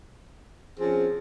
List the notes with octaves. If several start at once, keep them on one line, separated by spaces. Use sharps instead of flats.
F3 C4 C#4 G#4